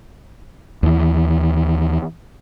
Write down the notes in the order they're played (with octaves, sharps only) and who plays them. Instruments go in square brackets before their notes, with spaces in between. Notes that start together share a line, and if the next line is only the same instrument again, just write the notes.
[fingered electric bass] D#2 E3